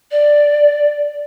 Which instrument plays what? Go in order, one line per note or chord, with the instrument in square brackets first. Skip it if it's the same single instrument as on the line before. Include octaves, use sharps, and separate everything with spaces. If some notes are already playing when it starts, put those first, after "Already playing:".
[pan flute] D5